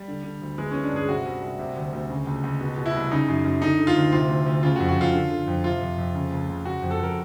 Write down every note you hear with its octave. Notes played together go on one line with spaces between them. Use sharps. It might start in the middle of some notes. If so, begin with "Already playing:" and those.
Already playing: G3
D3
D3
D2
E3 G#3
E3 C#4
D4
G2 G#4
C3 F#4
C2
C2
C3
D2
D2
C#3
C#2
C#2
B2
B2
E4
C2
C#3 D#4
F#2
F#2
D3 D#4
D3
F4
D2
C3 F4
D2
D2
C#3 F4
F#4
F2
F#4
F2 F4
D3
D3
F2
C3 F4
F2
F2
C#3
C#2
C#2
C#3 F#4
F2
A4
F2 A#4